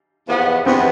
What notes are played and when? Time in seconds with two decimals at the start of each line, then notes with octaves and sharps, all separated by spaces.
0.27 E2 C3 F3 B3
0.65 E2 C3 F3 B3 C4